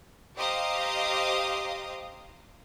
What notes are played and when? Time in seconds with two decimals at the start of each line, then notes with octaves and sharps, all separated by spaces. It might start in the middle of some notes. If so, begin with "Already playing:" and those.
0.35 G4 C5 D#5 F5 A#5 D#6